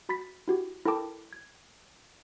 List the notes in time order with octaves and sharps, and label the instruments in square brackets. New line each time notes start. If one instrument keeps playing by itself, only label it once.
[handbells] F#4 B5 A6 B6
E4 F#4 G4
E4 A4 A#4 G5 A5 D6
G#6